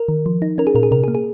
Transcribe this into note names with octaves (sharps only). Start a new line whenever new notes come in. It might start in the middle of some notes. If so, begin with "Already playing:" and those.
Already playing: A#4
D#3
F3
D#4
C#4 A#4
G#4
A#2 A#4
G#4
C3 A#4
G#4
A#3
G#4